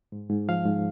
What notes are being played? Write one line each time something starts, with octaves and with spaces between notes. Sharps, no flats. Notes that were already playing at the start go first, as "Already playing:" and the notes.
G#2
G#2
F3 F5
G#2